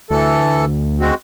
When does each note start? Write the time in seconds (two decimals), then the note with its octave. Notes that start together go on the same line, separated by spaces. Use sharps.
0.10 D2 E3 A4
1.00 G#3 C4 F#4